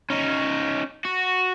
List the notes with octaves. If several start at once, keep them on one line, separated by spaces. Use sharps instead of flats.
C#4 D#4
F#4